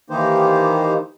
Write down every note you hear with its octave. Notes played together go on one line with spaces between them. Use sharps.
D#3 E3 A#3 D#4 G4 C5